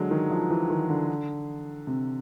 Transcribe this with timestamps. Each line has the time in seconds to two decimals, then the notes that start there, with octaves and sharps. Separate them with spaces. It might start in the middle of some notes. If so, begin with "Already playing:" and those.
Already playing: D3 F#3 G#3
0.11 D#3
0.31 F3
0.50 E3
0.70 D#3
0.89 D3
1.87 C3